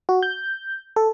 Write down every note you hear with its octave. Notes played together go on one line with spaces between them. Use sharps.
F#4
G6
A4